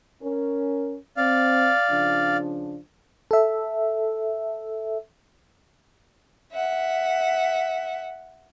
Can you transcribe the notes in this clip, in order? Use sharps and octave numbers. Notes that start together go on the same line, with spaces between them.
C#4 A#4
C4 D5 F5
C#3 F3 D4
A4 E5
E5 F#5